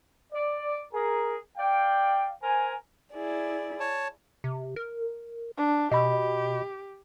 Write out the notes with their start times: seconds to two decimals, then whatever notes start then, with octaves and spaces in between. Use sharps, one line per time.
0.33 D5
0.93 G#4 A#4
1.58 D5 F5 G5
2.43 A#4 C5 G#5
3.13 E4 G#4 D5
3.80 C#5 A5
4.44 C3
4.76 A#4
5.57 D4
5.92 B2 G4 D#5 B5